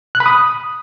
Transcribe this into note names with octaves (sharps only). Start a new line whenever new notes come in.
F#6
B5
D#6